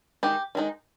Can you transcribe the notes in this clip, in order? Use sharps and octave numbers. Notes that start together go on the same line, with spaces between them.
D#3 G#3 D#4 G4
D#3 G#3 D#4